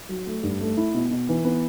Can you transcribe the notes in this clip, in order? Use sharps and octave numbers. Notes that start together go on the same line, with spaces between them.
F#3
A3
G2
A3
E4
B2
B2
E3
B3